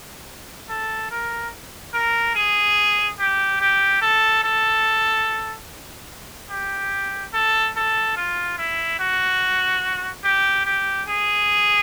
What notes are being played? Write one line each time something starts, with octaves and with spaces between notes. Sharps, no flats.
A4
A#4
A#4
G#4
G4
G4
A4
A4
G4
A4
A4
F4
E4
F#4
G4
G4
G#4